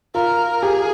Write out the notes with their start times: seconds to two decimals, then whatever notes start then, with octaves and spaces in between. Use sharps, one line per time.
0.15 F4 A#4
0.62 G4 G#4